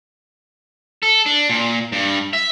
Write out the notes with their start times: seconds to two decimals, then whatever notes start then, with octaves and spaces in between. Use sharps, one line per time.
1.03 A4
1.26 D4
1.49 A#2
1.92 G2
2.33 E5